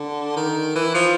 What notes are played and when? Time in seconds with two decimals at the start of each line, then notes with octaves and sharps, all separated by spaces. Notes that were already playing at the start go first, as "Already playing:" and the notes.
Already playing: D3
0.37 D#3
0.75 E3
0.94 F3